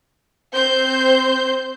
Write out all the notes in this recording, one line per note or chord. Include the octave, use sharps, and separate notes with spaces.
C4 C5 G6